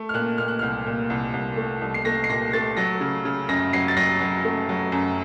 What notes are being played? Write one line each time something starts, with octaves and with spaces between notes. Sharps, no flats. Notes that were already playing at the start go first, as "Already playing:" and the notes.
Already playing: A3
F6
A#2 F#6
A#2 F6
F#6
C2 F6
A#2
C2
C2
A3
C2
C7
A3 A#6
C7
A#2 A#6
A3 A6
F#3 A#6
C#3
C#3
F#2 A#6
F#3 C7
A6
F#3 A#6
F#3
A3
F#3
F#2